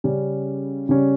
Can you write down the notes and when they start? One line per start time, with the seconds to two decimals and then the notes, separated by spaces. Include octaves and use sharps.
0.04 C#3 G3 C#4
0.89 C#3 G3 C#4